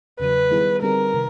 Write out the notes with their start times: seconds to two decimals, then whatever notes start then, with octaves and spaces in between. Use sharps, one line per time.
0.20 E2 C#3 F#3 B4
0.51 D#3 G3 B3 E4 G#4
0.82 D3 G3 C4 D#4 G#4 A#4
1.14 C3 D#3